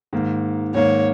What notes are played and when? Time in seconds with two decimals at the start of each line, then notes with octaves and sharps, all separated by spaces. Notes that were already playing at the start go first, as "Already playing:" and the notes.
0.13 G#2 D#3 A#3
0.74 G#2 D#3 A#3 C#5